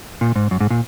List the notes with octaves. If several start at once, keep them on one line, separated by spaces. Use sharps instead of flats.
A#2
G#2
F#2
G#2
A#2